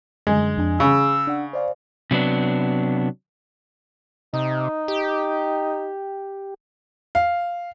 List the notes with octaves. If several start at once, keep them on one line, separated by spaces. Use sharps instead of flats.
F#2 D3 G#3
F2 D4 G#5
C#3 G#4 B5 E6
D4 F#5
C5 D5 F5
C3 F#3 B3 D4
C3 D#4
G4
F5